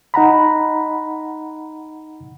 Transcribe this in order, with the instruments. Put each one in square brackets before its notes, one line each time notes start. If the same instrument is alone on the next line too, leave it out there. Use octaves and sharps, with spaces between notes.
[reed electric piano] D#4 F#5 A#5 B5